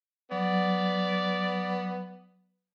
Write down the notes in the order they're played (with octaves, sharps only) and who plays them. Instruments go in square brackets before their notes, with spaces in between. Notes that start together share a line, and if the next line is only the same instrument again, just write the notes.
[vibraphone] F#3 [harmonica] B3 [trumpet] D5